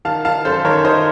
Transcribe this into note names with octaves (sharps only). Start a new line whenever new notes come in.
D#3 F5 A5
D#3 F5 A5
F#2 A4 C5
D#3 A#4 C#5
D#3 C5 D#5